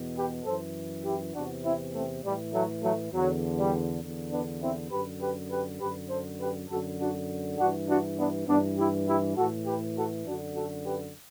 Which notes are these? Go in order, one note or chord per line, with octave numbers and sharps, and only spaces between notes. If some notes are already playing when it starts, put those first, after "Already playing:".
Already playing: E2 B2
G4 B4
F#2 E3 A4 C5
E4 G4
E2 C3 E3 D4 F#4
C4 E4
A3 C4
A2 E3 G3
F#3 A3
F#3 A3
E2 D3 F#3
G3
E2 D3
B3 D4
C4 E4
F#2 D3 G4 B4
G4 B4
G4 B4
F#2 D3 G4 B4
A4 C5
G4 B4
F#2 D3 F#4 A4
D4 F#4
G2 E3 D4 F#4
D4 F#4
B3 D4
G2 E3 B3 D4
E4 G4
E4 G4
A2 E3 F#4 A4
G4 B4
F#4 A4
F#2 D3 D4 F#4
F#4 A4
G4 B4